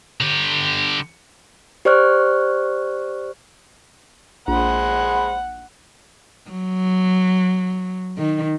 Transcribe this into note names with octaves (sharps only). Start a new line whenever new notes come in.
D3 G4
G4 C5 D5 C#6 F6 F#6
A#1 G#3 C5 F#5 B5
F#3
D#3